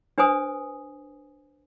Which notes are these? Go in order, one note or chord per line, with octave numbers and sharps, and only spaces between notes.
D4 B4 C5 G#5 D#6